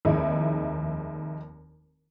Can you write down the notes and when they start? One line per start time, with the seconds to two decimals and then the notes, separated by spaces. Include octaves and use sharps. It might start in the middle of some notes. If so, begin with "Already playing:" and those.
0.05 F1 D#2 G#3 D#4 E4